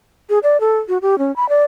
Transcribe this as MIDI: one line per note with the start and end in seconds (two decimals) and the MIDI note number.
0.29 0.39 68
0.43 0.60 74
0.60 0.78 69
0.88 0.98 66
1.02 1.18 67
1.18 1.34 61
1.36 1.48 83
1.49 1.64 74